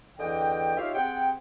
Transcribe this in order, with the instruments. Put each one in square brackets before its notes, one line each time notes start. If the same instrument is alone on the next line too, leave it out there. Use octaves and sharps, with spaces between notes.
[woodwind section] E2 D3 E3 D#5 G5
D#4 F4 G4 C#5 E5 F5
C4 G4 G#4 F#5 G5